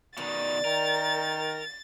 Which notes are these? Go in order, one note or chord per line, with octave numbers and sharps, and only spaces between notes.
B2 D#3 D#4 D5 A6
D#3 A#4